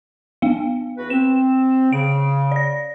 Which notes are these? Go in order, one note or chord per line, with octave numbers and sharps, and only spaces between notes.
B3 F5
E2 F#4 B4
C4 E7
C#3 D7
D5 A#6